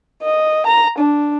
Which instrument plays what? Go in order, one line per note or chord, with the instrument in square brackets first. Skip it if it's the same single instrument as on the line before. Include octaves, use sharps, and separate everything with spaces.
[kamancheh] D#5
A#5
D4